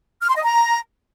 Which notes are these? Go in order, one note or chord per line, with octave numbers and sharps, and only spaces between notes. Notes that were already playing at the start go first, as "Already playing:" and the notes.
F6
C6
D#5
A#5